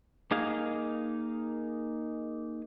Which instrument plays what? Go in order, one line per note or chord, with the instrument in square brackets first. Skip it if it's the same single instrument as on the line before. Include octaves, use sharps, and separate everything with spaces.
[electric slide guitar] A#3 D#4 G#4 F5